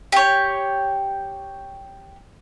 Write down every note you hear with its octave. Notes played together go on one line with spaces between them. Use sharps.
G4 C#5